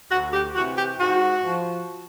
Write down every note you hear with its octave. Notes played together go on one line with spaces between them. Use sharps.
D2 F#4
G4
C3 E3 F#4
G4
G#2 F#4
F3